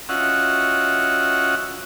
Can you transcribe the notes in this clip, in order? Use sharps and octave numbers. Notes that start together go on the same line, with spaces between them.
C#4 F4 F#4 D#5 E5 F#5